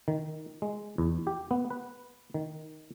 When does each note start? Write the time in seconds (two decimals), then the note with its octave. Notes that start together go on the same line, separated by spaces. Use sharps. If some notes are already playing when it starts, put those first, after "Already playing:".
0.08 D#3
0.62 G#3
0.98 E2
1.27 G4
1.51 B3
1.70 B4
2.34 D#3